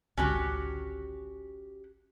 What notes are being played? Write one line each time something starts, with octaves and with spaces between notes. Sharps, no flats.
G#1 C#2 D3 C#4 F#4 G4